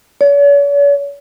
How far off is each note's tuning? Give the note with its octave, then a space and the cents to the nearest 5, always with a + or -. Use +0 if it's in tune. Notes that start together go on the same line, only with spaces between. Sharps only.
C#5 +45